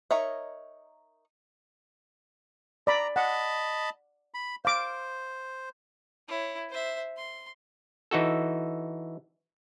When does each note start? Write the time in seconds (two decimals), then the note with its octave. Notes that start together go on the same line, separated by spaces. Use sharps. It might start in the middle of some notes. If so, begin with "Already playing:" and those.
0.11 D#4 A#4 C#5 D#5 E5
2.87 D5 A#5 B5
3.16 D#5 F#5 A5 B5
4.34 B5
4.65 C5 F5 D6
6.28 E4 C#5
6.70 C5 E5
7.17 C6
8.11 E3 D#4 F#4 A4